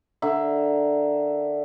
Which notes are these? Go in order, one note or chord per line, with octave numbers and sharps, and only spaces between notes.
D3 A#4 E5